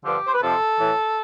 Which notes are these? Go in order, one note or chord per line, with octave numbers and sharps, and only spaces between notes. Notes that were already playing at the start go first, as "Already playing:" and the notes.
G2 D3 F3 G4
C5
B4
F2 C3 F3 A4
A2 E3